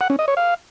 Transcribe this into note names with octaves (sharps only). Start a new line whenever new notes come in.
F#5
C#4
D#5
C#5
F5